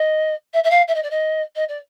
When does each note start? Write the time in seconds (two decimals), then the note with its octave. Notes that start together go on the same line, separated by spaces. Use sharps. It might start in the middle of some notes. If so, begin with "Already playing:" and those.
Already playing: D#5
0.53 E5
0.64 E5
0.70 F5
0.88 E5
0.95 D#5
1.03 D5
1.10 D#5
1.55 D#5
1.69 D5